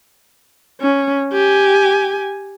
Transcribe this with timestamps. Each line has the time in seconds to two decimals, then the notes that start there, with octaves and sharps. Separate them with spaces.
0.81 C#4
1.33 G4 G#5